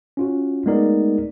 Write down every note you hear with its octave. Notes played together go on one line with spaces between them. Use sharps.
C#4 F4 F#4
G#3 A3 B3 D#4 A#4 D5